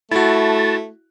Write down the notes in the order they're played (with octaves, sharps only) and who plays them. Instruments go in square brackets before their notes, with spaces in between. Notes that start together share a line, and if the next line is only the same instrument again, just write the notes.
[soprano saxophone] A3 [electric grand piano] E4 F#4 [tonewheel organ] A5